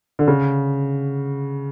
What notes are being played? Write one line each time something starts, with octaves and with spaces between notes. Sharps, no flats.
D3
C#3